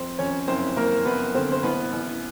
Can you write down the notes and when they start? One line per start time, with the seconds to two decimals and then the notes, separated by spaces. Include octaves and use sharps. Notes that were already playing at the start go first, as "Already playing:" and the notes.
Already playing: F2 C4 C5
0.19 F2 C#4 C#5
0.48 F#1 C4 C5
0.77 F#1 A#3 A#4
1.05 F#1 B3 B4
1.34 D3 C4 C5
1.52 C5
1.63 A1 B3 B4
1.92 A1